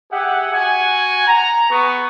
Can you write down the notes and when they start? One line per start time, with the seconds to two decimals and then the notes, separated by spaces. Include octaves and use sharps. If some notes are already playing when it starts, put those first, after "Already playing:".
0.12 G4 G#4 E5 F#5
0.53 F#4 F#5 G#5
1.27 A#5
1.70 B3 G#4 B4 C#6 D#6